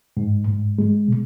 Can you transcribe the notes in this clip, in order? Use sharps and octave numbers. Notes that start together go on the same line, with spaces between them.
G#2
G#2
G#3
B2